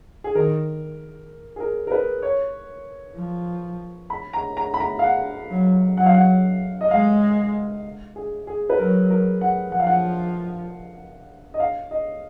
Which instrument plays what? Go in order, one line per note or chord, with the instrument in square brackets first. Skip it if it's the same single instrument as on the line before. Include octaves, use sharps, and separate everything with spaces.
[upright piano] G#4
[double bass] D#3 [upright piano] A#4
[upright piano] G#4
A#4
A#4
B4
C#5
[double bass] F3
[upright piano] B5
A#5
A#5
B5
A#5
F5
F#5
[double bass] F#3
[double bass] F#3 [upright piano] F#5
[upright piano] F5
F#5
D#5
[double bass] G#3 [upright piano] F5
[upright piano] G#4
G#4
B4
[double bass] F#3 [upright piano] A#4
[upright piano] A#4
F#5
[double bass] F3 [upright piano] F#5
[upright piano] F5
F#5
D#5
F5
D#5